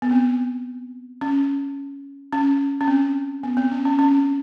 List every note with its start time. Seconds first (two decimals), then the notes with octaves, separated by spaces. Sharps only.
0.02 B3
0.11 C4
1.21 C#4
2.33 C#4
2.81 C#4
2.87 C4
3.43 B3
3.57 C4
3.72 C#4
3.85 C#4
3.99 C#4